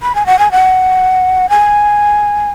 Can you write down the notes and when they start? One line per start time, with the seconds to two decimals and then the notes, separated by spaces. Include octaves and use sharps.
0.02 B5
0.15 G#5
0.26 F#5
0.39 G#5
0.52 F#5
1.49 G#5